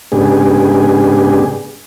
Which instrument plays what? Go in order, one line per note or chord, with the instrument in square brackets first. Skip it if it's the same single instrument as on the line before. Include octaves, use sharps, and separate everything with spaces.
[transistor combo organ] G#2 C#3 B3 D4 G4 G#4